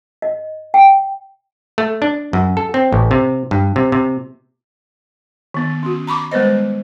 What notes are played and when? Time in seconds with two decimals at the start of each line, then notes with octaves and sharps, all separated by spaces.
0.22 D#5
0.74 G5
1.78 A3
2.02 D4
2.33 F#2
2.57 A4
2.74 C4
2.92 A1
3.11 C3
3.51 G2
3.76 C3
3.92 C3
5.54 D#3 B3
5.83 C#4 F#4
6.07 A#5 B5 C#6 D6
6.32 G3 G#3 B3 B4 C5 D#5